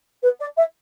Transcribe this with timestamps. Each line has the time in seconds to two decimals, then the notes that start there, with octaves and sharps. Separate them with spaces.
0.22 B4
0.40 D5
0.57 E5